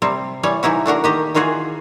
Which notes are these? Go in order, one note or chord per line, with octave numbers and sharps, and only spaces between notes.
C3 G3 C4
E3 G3 C#5
C3 E3 D#4 E4 F#4
A3 D4 F#4 A#4
D#3 G4 D#5
D#3 E3 F4 F#4 G#4